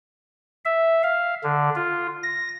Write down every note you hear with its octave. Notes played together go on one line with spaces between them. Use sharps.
E5
F5
D3
F4
A#6